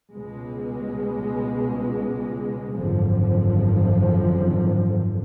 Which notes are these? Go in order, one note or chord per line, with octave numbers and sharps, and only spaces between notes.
C#2 B2 G#3
G#1 F#2 D3 F3